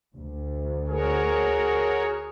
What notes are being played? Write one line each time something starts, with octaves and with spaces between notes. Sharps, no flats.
D2
F#4 G#4 A#4 C#5